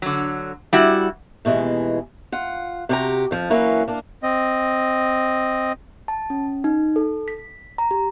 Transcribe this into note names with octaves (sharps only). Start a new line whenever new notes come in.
D3 F#3
G3 E4 F#4
D#2 B2 E3 G#3
F4 F#5
C3 F#4 G4 A4 G5 A#5
F2 F3
E3 F#3 A#3 C#4 E4 B4
A#3 D4 A#4
C4 D#5
A5
C#4
D#4
A4
B6
A#5
G4